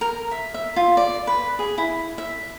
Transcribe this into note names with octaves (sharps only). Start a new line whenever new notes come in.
A#4
E5
E5
F4
D5
B4
G#4
E4
E5